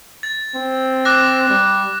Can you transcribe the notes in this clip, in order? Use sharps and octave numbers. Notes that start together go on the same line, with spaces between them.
A6
C4
D6 F#6 A#6
G3